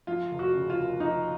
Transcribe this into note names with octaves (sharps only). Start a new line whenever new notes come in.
F3 F4
F1
F#4
C#3
F4
D#2
F3 D#4